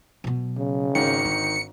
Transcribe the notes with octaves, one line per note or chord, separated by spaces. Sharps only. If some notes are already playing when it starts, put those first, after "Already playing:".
B2 F#3
C#3
G#1 D#3 C#7
D3